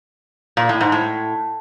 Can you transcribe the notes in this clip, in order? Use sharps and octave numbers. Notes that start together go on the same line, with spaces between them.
A#2
A2
G#2
A2